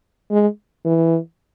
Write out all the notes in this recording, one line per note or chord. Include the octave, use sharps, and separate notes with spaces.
G#3
E3